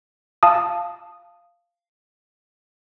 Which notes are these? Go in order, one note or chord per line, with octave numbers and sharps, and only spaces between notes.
F5 A5 D#6